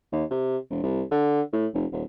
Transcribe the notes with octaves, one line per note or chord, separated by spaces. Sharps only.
D#2
C3
E1
C2
D3
A2
F1
D#1